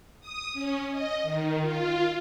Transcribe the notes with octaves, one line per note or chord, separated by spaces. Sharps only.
D#6
C#4
D#5
D#3
F4